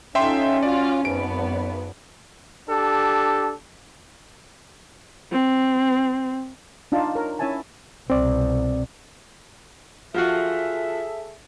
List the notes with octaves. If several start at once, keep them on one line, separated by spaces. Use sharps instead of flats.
C#4 D#4 F4 A4 E5 G5 C6
F4 F#4 D5
G#1 F#2 B3 D7
D4 G4 A4
C4
D4 D#4 F4 F5 A5
A#4 C#5
C#4 E4 C#5 E5 G#5 A5
C2 B2 C4 D5
F3 F4 F#4 G#4 A4 E5